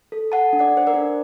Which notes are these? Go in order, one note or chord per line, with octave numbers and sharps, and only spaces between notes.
A4
A4 F#5 A5
D4
D5 F#5
D4 C5
A#4 D5
D4